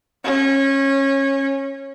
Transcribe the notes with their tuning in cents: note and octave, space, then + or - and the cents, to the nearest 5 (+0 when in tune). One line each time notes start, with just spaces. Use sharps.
C#4 -25